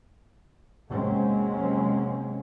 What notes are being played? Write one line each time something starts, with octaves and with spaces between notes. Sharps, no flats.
C3 F#3 G#3 A#3 C4 C#4